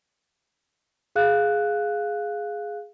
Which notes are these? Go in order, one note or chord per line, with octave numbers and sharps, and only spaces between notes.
G#4 F5 F#6